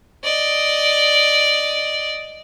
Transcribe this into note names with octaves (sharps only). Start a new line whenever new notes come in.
D5 D#5